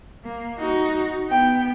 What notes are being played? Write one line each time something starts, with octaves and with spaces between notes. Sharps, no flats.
A#3
D#4 F#4
B3 G5